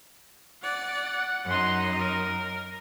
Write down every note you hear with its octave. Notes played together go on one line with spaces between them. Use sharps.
D5 F#5
F#2 D#4 F#5 C6
A#4